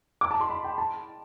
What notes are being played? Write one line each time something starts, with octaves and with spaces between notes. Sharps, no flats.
D6
A5
C6
B5
G5
A5